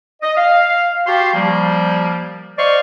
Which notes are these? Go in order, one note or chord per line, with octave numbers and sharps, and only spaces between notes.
D#5
F5
F#4 G4 F5 G5 A5 C6
F3 G3 A#3
C5 D5 D#5 F5 C6 C#6